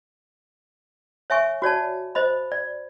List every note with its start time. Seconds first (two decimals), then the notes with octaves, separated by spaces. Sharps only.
1.30 C#5 E5 G#5 C#6
1.62 F#4 C#5 D5 A5
2.15 C5 D#5 B5
2.52 D5